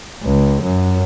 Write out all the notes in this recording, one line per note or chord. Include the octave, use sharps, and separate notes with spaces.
C#2
F#2